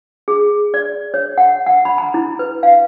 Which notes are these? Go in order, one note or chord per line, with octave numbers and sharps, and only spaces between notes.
G#4
D5
C#5
F#5
F#5
B5
A#5
E4
B4
F5